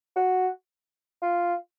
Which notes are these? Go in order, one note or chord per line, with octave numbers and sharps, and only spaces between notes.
F#4
F4